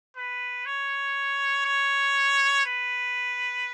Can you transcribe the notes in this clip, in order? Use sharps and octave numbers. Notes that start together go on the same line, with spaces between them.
B4
C#5
C#5
B4